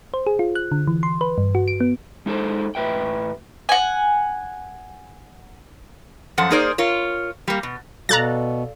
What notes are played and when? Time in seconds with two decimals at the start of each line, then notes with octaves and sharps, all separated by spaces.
0.14 C5
0.27 G#4
0.39 F4
0.55 F#6
0.72 D3
0.87 E3
1.03 C6
1.21 B4
1.38 G2
1.55 F#4
1.68 D7
1.80 B3
2.26 G#3 D#4 G#4 A4 C5
2.75 A2 B4 E5 G5
3.69 F#5 G#5
6.38 F#2 F3 A4 F#5
6.50 A#3 D#4 G#4 A#4 C5 D5
6.78 F4 A#4 C#5
7.48 G3 A#3
7.63 B2
8.09 B2 A4 D5 F5 A#5 F#6 A6